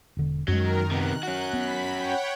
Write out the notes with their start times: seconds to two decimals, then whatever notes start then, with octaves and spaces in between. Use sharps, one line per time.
0.17 E1 D3
0.48 F#2 D#3 F#3 G#3 A#4
0.91 C3 B3 F#6
1.23 C#4 F#4
1.53 B3 B5 B6
1.93 C#5 F#5 G5